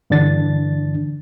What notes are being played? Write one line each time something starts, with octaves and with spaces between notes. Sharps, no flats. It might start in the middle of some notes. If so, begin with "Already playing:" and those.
G2 D3 E3 D4 A6